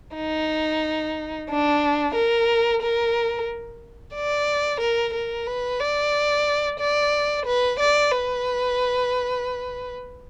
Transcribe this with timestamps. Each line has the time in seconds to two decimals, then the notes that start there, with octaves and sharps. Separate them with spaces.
0.16 D#4
1.49 D4
2.15 A#4
2.82 A#4
4.14 D5
4.81 A#4
5.13 A#4
5.47 B4
5.80 D5
6.79 D5
7.45 B4
7.79 D5
8.12 B4